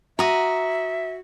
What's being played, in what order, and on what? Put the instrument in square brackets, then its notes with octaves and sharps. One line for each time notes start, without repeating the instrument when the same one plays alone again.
[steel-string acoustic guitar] F#4 [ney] E5 [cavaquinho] A#5 D#6